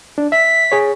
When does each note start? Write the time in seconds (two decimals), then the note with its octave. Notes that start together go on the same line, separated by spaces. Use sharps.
0.18 D4
0.32 E5 B6
0.72 G#4 C#5